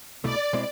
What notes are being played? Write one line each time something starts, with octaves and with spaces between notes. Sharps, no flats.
C2 B2 A3 E4 D5
B2 G#3 C4 E4